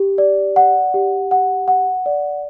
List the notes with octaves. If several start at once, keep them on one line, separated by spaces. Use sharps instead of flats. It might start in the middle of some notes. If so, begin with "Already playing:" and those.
Already playing: G4
D5
F#5
G4
F#5
F#5
D5